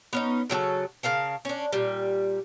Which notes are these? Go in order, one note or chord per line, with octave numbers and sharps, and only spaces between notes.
B3 C#4 D#4
C#3 F#3 G4 A4
C#3 A#4 F5 A5
C#4 D4
A#2 G3